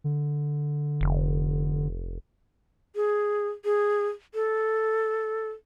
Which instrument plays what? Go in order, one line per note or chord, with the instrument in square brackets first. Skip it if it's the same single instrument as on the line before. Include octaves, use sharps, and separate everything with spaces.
[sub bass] D3
[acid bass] F1
[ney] G#4
G#4
A4